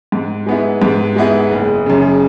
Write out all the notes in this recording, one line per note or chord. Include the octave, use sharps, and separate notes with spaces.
G#2
G#3 B3 E4
G#2
G#3 B3 E4
F#1
F#2 C#3